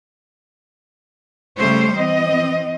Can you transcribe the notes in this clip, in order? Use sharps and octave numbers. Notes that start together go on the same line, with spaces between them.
C#3 G3 A3 C5 C#5
E3 C4 D#5